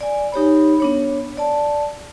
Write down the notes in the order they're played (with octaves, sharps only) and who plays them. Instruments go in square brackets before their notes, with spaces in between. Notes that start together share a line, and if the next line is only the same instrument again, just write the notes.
[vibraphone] D5 G#5
D#4 G4 C#5 B5
B3 D4 C#5
D5 A5